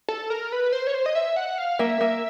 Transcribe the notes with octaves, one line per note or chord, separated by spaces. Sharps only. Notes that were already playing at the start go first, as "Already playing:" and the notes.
A4
A#4
B4
C5
C#5
C5
D#5
E5
F#5
F5
A#3 E5
A#3